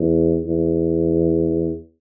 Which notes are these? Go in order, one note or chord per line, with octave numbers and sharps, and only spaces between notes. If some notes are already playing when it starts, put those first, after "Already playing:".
Already playing: E2
E2